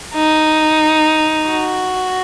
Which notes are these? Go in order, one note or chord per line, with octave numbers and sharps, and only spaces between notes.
D#4
F#4